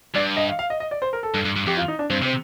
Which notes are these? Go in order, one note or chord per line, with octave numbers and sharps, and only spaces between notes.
G2 D5
D#5
F5
F5
D#5
D#5
D5
C5
A#4
A4
G2
G2
G2
F2 G4
F4
D#4
D4
G2 C4
C3 C4